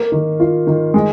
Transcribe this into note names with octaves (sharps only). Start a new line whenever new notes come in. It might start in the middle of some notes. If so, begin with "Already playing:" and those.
Already playing: A#3
D#3
F4
D#3
G#3